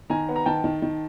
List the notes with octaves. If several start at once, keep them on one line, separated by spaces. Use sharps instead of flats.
D#3 G#5 A#5
B3
A#5
D#3 G5 A5
D#3
D#3